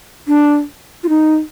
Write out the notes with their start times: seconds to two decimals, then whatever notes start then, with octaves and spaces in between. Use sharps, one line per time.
0.28 D4
1.04 F4
1.09 D#4